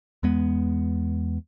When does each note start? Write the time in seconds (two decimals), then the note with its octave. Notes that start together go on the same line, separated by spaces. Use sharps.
0.23 E2 G#3 B3